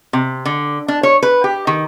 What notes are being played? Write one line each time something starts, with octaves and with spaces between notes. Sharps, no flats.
C3
D3
D4
C#5
B4
G4
D#3